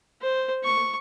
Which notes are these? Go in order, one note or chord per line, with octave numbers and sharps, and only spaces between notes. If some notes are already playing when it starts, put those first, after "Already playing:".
C5
C#6